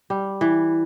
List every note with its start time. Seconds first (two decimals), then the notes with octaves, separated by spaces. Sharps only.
0.10 G3
0.41 E3